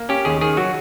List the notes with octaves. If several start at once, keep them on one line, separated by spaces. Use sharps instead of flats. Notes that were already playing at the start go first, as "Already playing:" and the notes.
Already playing: A#3
C#4 G4
D#2 G#4
D#3 G#4
F#3 F#4